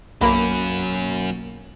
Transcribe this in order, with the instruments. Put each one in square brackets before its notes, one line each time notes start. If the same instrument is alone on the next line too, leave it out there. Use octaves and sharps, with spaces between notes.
[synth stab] B1 A#3 [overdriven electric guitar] F#3 C#4 [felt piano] B5